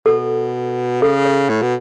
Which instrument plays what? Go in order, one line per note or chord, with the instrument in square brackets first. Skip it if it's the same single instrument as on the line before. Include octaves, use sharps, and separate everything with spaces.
[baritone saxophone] B2 [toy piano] A4
[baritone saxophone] C#3 [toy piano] A4
[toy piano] C#5
[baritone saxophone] A2
B2